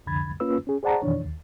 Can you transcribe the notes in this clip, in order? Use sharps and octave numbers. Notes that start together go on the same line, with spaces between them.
C2 F2 D3 B5 G#6 A6
A#3 C#4 F4 B4 E6
C#4 G#4
G#4 C5 D5 F#5 A5 A#5
F2 B2 D#3 E3 D4 C#5
D#2